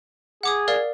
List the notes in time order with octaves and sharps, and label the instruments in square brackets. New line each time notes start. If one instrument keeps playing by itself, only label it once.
[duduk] G#4 [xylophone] F#5 D6 D#6
[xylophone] A#4 D5 F5